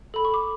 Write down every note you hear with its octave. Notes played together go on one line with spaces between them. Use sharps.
A4 B5
C#6
D6